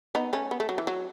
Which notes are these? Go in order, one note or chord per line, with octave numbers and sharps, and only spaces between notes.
B3 D#4
A3 C#4
B3
A3
F#3
E3
F#3